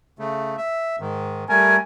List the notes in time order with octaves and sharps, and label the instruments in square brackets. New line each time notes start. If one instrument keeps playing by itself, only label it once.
[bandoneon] C#3 A3
E5
G#2 D#3
[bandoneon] G3 A3 A#4 [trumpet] G#5